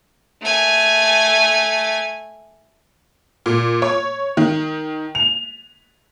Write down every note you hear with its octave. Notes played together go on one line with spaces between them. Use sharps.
A3 G#5
A#2
C#5
D#3
F7